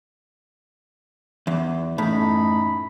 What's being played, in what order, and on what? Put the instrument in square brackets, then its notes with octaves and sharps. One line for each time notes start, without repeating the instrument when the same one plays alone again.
[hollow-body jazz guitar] E2
[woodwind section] F#2 D#4 B5 [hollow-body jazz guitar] A2